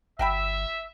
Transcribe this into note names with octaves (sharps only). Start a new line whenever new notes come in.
G1 F#4 E5 G5 B5